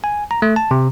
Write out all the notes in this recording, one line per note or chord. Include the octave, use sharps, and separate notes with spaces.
G#5
A#5
A3
A5
C3